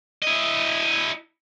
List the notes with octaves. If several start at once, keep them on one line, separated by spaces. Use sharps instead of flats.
E4 D#5